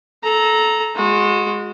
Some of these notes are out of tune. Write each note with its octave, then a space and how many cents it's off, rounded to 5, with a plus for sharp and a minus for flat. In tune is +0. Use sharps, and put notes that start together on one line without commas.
A4 -20 A#5 +0
G#3 +0 F#4 -30